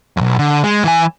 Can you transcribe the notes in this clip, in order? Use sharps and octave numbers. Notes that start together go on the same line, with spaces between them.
B1 F2
D3
G#3
E3 G#5